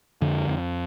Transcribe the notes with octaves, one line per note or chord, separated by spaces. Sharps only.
F2 D3
F2